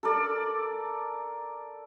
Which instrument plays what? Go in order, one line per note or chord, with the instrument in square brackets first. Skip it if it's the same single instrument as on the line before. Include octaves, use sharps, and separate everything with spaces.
[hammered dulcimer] A4 A#4 D5